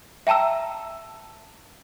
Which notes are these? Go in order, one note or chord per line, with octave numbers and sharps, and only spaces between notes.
E5 G5 A5 A#5 E6